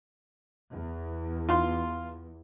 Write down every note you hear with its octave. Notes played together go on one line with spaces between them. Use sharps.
E2
F4 C6